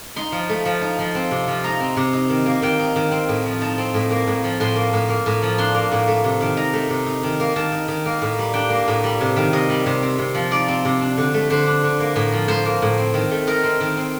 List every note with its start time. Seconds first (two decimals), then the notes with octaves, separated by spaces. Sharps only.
0.16 D#4 C6
0.32 F3
0.49 A3
0.65 F3
0.81 D#4
0.99 F3
1.15 C4
1.31 C3
1.48 F3
1.64 D#4 A#5
1.80 C4
1.97 C3
2.13 D#4
2.30 D#3
2.46 A#3
2.62 D#3 G5
2.79 D#4
2.96 D#3
3.11 C4
3.28 A2
3.45 F3
3.61 D#4 A5
3.78 C4
3.94 A2
4.11 A#3
4.27 A2
4.44 F3
4.60 A2 C6
4.76 A#3
4.93 A2
5.09 A#3
5.26 A2
5.42 F3
5.58 D4 C6
5.74 A#3
5.92 A2
6.08 A3
6.24 C3
6.41 D#3
6.57 D#4 A#5
6.73 A3
6.90 C3
7.06 D#4
7.23 D#3
7.40 A#3
7.56 D#3 A5
7.72 D#4
7.88 D#3
8.06 A#3
8.22 A2
8.38 G3
8.54 D4 G5
8.70 A#3
8.88 A2
9.04 G3
9.20 C3
9.36 D#3
9.53 C3 D#5
9.70 G3
9.86 C3
10.03 C4
10.18 C3
10.34 F3
10.51 D#4 D5
10.68 C4
10.85 C3
11.01 D4
11.17 D3
11.34 A3
11.50 D3 C5
11.66 D4
11.83 D3
12.00 A#3
12.16 A2
12.32 F3
12.48 A2 C5
12.65 A#3
12.82 A2
12.98 C4
13.14 D#3
13.31 A3
13.47 D#4 A#4
13.63 C4
13.81 D#3
13.96 C4